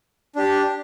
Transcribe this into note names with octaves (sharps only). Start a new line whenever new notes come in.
D4 G4